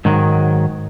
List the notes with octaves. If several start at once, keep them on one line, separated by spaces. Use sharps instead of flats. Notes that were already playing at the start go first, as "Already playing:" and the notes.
G#2 D#3 F#3